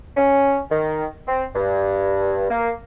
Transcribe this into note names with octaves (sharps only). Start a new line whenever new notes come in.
C#4
D#3
C4
G2
A#3